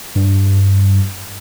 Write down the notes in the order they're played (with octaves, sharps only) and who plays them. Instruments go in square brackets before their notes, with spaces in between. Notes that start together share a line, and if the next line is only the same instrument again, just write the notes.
[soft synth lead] G2